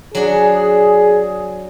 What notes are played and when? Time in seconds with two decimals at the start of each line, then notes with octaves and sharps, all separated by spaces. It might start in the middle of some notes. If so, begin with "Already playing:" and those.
0.15 F#3 D4 G#4